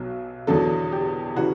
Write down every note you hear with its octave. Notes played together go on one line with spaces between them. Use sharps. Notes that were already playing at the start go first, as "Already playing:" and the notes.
Already playing: B1 B2 F#3
E2 D3 F#3 A4
G4
C#3 E3 F#4